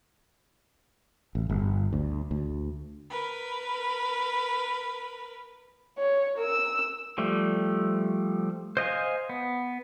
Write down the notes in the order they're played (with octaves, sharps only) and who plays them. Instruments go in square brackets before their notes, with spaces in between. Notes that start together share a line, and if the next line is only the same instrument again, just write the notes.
[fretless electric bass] A1
G1
D2
D2
[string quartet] A#4 B4
[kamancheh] C#5
A#4 E6
[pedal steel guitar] F3 G3 A3
C5 D#5 F5 G#5
B3